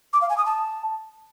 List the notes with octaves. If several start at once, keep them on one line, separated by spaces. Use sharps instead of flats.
D6
F5
G#5
D#6
A5